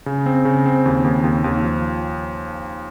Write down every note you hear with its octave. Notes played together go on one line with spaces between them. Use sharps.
C#3
C4
C#3
C4
D#2
D#2
D#2
D#2
F3